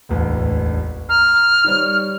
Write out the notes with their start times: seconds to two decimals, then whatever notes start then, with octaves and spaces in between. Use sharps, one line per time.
0.09 E1 A1 D2
1.09 A#5 F6
1.64 D#3 G3 C#5